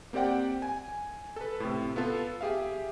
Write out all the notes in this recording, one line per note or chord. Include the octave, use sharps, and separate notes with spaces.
A#3 C4 G4 D5 F#5 G5
G#5
A4 B4
A2 C3
B3 F4 A4
G4 G#4 E5 F5